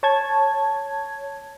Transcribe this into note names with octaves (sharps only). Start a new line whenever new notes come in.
C#5 A5 G#6